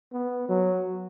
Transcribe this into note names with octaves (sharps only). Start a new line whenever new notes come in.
B3
F#3